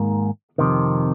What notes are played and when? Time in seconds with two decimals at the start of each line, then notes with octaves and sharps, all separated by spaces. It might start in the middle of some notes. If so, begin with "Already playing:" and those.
Already playing: G#2 D#3 A#3
0.58 F2 C3 D#3